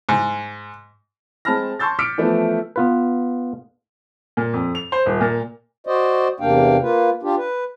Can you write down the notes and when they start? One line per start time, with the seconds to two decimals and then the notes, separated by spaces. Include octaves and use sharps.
0.09 G#2
1.45 G#3 C4 A5 B5 F6 A#6
1.79 A5 C6 C#6 E6 G6 A6
1.99 D6 E6 F6 B6 C#7 D7
2.18 E3 F3 A3 B3 E4
2.76 B3 F4 B4
4.37 A#2
4.53 F2
4.75 F7
4.92 C5
5.06 D#1
5.21 A#2
5.87 F#4 C5 D5 D#5
6.40 E2 C3 A#3 D4 F5 G5
6.82 A#3 F4 B4
7.23 D4 F4 G4
7.38 B4